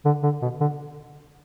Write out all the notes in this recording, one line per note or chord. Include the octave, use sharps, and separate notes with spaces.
D3
D3
B2
D3